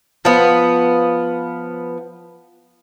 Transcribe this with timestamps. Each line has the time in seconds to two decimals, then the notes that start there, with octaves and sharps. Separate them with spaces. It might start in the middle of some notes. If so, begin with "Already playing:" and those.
0.25 F3 B3